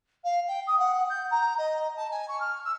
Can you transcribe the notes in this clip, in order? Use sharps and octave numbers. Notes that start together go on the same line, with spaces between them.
F5
G5
D#6
F#5
G6
A#5
D#5
A5
G#5
C#6
F6
E6